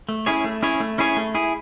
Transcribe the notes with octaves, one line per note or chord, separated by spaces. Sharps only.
A3
C#4 E4 G#4 C#5
A3
C#4 E4 G#4 C#5
A3
C#4 E4 G#4 C#5
A3
E4 G#4